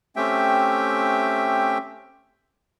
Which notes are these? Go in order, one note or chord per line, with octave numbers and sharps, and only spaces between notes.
A3 C4 C#4 G4 E5 G5